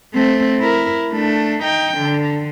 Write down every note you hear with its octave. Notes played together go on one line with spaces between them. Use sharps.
A3 C4
E4 A#4
A3 D4
D#4 G5
D3